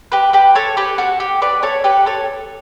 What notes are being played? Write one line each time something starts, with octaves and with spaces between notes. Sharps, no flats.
G4 B4
G4 B4
A4 C#5
G4 B4
F#4 A4
G4
B4 D5
A4 C#5
G4 B4
A4 C#5